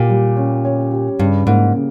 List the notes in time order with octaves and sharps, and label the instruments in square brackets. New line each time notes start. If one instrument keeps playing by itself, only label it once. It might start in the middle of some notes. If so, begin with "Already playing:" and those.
Already playing: [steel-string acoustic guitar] A#2 [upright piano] G4
[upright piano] G3
C#4
C#5
G4
[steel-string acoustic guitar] G2 [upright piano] C#3
[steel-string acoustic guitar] G#2 [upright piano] A#3
[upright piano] C#3